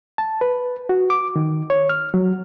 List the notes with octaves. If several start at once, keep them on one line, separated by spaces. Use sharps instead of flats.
A5
B4
F#4
D6
D#3
C#5
F6
F#3